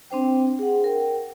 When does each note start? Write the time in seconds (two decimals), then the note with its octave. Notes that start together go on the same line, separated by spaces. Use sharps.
0.11 C4 D4 C5 G5
0.59 G#4 F#5
0.84 A#4 G5